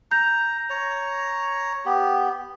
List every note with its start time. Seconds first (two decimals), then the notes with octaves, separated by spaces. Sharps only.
0.11 A#5 G6
0.70 C#5 A#5
1.85 B3 G4